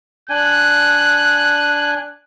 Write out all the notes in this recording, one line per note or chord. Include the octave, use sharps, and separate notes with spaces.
D4 G#5 F#6